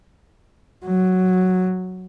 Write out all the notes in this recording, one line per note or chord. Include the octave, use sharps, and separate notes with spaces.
F#3